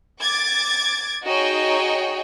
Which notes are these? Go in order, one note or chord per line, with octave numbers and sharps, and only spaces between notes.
D6 G#6 A6
D#4 F#4 G#4 C#5 D#5 G5